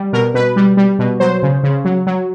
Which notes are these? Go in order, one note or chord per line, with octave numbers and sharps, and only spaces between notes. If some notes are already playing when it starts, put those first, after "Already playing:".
Already playing: G3
B2 A#4
B2 B4
G3
G3
B2
F#3 C5
C#3
C#3
F#3
F#3